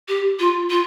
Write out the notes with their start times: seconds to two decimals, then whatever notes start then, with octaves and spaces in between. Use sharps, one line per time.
0.08 G4
0.39 F4
0.70 F4